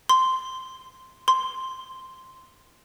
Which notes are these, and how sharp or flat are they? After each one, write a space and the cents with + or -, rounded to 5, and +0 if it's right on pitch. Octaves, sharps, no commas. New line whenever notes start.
C6 -10
C6 -5